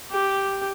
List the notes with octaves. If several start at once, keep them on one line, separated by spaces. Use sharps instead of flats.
G4